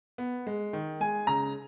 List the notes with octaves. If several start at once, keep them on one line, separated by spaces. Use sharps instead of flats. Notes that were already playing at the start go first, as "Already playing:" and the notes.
B3
G#3
D#3
G#3 G#5
C#3 A#5